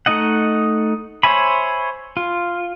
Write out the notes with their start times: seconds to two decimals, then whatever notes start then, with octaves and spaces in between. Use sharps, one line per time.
0.06 A3 D#4 D#5 F#5
1.23 C5 C#5 E5 G#5 B5
2.17 F4